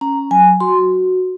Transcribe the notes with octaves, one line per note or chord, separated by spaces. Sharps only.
C#4 A#5
F#3 G#5
F#4 C6